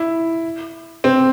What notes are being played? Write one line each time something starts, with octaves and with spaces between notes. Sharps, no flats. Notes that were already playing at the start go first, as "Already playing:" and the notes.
Already playing: E4
C4